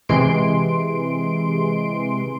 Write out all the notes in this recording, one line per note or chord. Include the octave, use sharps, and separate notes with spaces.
C3 E3 G#3 C6 D7